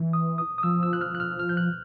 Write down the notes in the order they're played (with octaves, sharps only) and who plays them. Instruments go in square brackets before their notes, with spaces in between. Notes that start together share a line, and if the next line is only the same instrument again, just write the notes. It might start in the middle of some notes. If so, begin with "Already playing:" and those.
Already playing: [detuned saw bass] E3
[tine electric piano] D#6
D#6
D#6
[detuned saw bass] F3 [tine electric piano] E6
[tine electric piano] E6
F#6
F6
F#6
F6
F6
G6
F#6